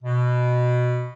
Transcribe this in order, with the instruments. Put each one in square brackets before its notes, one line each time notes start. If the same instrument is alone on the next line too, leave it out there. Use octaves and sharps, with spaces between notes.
[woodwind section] B2